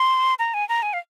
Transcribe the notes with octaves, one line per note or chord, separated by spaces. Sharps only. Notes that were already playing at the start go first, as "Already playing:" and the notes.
Already playing: C6
A#5
G#5
A#5
G#5
F5